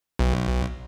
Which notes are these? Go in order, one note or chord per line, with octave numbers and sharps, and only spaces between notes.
B1